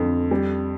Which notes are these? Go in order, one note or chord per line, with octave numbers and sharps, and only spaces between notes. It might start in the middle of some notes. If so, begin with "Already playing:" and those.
Already playing: F2 D3
G3